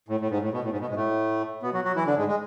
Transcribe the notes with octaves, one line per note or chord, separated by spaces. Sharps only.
A2
A2
G#2
A2
B2
A2
G#2
B2
G#2 G#3
A2 A3
B2 B3
F#3 F#4
F#3 F#4
E3 E4
D3 D4
G#2 G#3
G#3